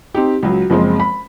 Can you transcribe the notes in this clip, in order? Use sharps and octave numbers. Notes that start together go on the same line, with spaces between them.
C4 D#4 G4
C#2 F#3
F#1 F3 G#3 C4
B5